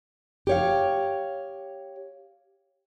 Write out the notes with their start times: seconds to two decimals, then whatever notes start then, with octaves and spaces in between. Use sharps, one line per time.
0.47 G4 C#5 F5